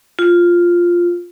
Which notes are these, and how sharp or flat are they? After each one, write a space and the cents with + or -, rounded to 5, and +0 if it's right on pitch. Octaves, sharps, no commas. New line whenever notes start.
F4 +0